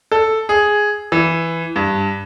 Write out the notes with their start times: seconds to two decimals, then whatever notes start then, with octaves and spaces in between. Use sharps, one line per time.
0.12 A4
0.49 G#4
1.12 E3
1.76 G2